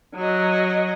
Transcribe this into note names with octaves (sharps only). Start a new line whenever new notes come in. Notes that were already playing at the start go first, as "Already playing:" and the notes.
F#3 D#5